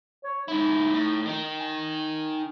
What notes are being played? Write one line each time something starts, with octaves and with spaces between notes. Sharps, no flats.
C#5
G#2 D#4 E4
A2
D#3 D#4
G#5